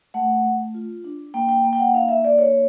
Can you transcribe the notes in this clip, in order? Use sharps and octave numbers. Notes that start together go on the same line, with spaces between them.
A3 F#5
A3
F4
D4
A#3 G5
G5
A#3
G5
F#5
D#4 F5
E5
A#3 D5
C#5